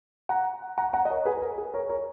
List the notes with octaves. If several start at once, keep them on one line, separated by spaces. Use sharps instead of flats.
F#5 A#5
F#5 A#5
F#5 A#5
D#5
A#4 C#5
G#4 B4
B4
A#4
G#4
A#4 C#5
A#4 C#5